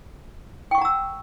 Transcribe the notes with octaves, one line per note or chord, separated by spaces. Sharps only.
F#5 G5 A#5 C#6 E6